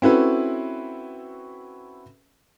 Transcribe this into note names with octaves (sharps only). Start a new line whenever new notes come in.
C4 C#4 E4 F#4 A4 B4